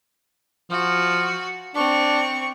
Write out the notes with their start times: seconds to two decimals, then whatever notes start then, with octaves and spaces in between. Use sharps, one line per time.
0.71 F3 F#4
1.75 C4 D4 C#6